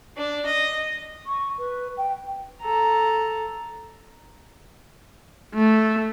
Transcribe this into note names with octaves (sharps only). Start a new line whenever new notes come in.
D4
D#5
C#6
B4
G5
A4 A#5
A3